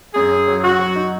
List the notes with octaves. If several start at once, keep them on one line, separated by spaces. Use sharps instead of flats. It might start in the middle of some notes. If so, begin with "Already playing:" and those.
F#2 G#4
F#2
F#3
F#3 F#4
F#3
D#4